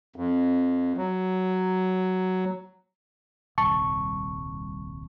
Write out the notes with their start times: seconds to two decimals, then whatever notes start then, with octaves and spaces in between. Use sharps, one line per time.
0.16 F2
0.97 F#3
3.58 D#1 C2 A5 C#6